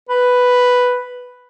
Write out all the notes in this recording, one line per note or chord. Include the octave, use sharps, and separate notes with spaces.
B4